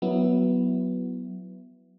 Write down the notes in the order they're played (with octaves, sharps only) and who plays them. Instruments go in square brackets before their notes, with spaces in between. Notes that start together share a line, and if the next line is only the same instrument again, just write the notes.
[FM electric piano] F#3 B3 E4